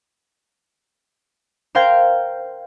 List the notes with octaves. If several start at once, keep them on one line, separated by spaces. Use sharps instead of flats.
A#4 C5 F5 G5 G6 G#6